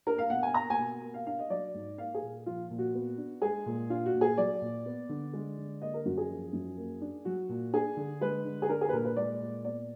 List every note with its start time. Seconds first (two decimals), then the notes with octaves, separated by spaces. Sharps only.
0.06 D4 A#4
0.18 F5
0.30 B2 F#5
0.43 G#5
0.54 A#3 A#5
0.70 G#5
0.78 B2
1.02 A#3
1.14 F5
1.26 D4 F5
1.39 D#5
1.50 F#3 D5
1.74 G#2
1.98 A#3 F5
2.14 G#4
2.22 A#2
2.46 F3 F4
2.70 A#2
2.78 F#4
2.94 B3
3.18 D4
3.42 G#3 G#4
3.66 A#2
3.90 D4 F4
4.06 F#4
4.14 A#2
4.21 G#4
4.38 F#3 D5
4.62 A#2
4.86 B3
5.09 D3
5.33 G#3
5.58 D3
5.81 A#3 D#5
5.94 A#4
6.05 F#2 F#4
6.18 G#4
6.30 F3
6.53 F#2
6.77 A#3
7.01 D4
7.25 F#3 F#4
7.49 A#2
7.73 D4 G#4
7.97 D3
8.21 G#3 B4
8.45 D3
8.62 G#4
8.69 D4 A#4
8.81 G#4
8.89 B4
8.93 A#2 A#4
9.05 B4
9.16 G#3 D5
9.40 A#2
9.64 B3 D5